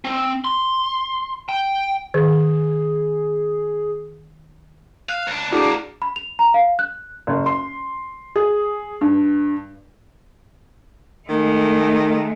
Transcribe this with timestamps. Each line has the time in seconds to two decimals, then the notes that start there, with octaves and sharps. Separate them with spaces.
0.05 C4
0.45 C6
1.49 G5
2.14 D#3 G#4
5.09 F5 F#6
5.28 C#2 D4
5.52 D2 A#3 D4 E4 F#4 G#4
6.02 B5
6.16 F7
6.39 A#5
6.54 F5
6.79 F#6
7.27 F#1
7.46 C6
8.36 G#4
9.01 G2
11.29 D#3 G#3 A3